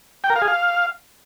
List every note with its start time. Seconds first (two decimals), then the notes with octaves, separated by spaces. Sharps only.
0.24 G5
0.30 A#4
0.36 F5
0.42 G#4
0.48 F5